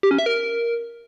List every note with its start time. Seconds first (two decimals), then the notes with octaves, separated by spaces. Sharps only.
0.03 G4
0.11 C#4
0.19 E5
0.26 A#4